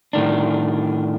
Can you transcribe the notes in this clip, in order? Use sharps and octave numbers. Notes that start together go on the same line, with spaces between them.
A2 D#3 D4